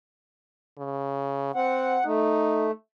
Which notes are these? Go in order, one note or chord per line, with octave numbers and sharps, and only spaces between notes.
C#3
C4 F#5
A3 D#4